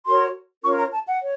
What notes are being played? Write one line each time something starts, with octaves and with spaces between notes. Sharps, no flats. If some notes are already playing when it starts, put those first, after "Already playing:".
F#4 A#4 C#5 C6
C#4 F4 A#4 C#5 C#6
A#5
A5
F#5
C#5